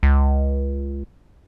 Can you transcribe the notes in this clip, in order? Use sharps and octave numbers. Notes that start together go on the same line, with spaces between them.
C#2